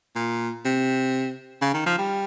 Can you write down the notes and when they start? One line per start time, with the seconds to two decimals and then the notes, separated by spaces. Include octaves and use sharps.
0.15 A#2
0.65 C3
1.61 C#3
1.74 D#3
1.86 F3
1.98 G3